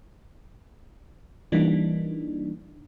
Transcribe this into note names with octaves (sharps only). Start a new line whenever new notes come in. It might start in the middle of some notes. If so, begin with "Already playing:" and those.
E3 G3 A#3 D4 D#4